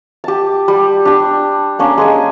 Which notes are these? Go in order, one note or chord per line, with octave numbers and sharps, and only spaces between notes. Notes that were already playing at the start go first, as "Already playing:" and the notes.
G4 A5
G3
D4 G4
A#3 C#4 D4
G#3 G#4 G#5